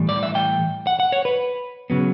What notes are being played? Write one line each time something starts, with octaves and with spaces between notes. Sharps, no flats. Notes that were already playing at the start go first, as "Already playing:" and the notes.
Already playing: A2 E3 G3
D5
E5
G5
F#5
F#5
C#5
B4
C#3 F#3 B3